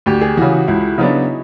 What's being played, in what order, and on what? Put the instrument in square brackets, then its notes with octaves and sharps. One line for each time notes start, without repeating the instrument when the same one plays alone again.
[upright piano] D2 [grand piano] G4
[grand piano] G#4
[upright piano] C#3 E3 [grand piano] F#4
[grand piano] F#4
[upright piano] C#2 [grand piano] E4
[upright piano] C#3 F#3 B3 D4 [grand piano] D#4